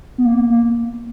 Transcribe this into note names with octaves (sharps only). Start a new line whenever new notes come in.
B3
A#3
A#3
A#3